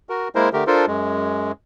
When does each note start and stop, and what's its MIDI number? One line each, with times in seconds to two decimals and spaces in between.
0.09 0.28 66
0.09 0.28 70
0.35 0.49 56
0.35 0.49 58
0.35 0.49 64
0.35 0.49 70
0.35 0.49 72
0.53 0.64 50
0.53 0.64 57
0.53 0.64 67
0.53 0.64 70
0.67 0.86 62
0.67 0.86 65
0.67 0.86 69
0.67 0.86 70
0.67 0.86 72
0.87 1.52 42
0.87 1.52 56